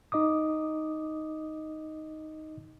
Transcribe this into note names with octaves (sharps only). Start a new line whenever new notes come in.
D#4 D#5 D6 D#6